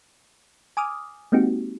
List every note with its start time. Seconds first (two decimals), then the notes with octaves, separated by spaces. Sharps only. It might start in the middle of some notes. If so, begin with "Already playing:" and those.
0.77 G#5 D6 D#6 F6
1.32 G#3 A#3 C4 D#4 F#4 G4